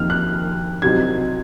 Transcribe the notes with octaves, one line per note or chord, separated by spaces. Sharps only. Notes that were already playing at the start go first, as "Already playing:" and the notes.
Already playing: F2 D#3 A#3 D#4 F6
F#6
C2 C3 F#3 C4 D#4 G#6